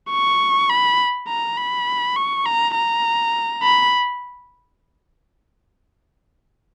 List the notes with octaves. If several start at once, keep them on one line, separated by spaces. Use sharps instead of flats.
C#6
B5
A#5
B5
C#6
A#5
A#5
B5